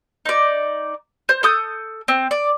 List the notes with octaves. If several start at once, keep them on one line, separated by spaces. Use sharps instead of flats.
D#4 D5
C5
A4 D#6 G6
C4
D5